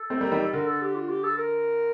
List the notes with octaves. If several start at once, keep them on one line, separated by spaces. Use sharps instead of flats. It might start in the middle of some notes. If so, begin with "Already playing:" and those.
Already playing: A4
A3 C4
G3 A#3
D#3 G3
A4
D3 A#4
A4
G4
F4
G4
A4
A#4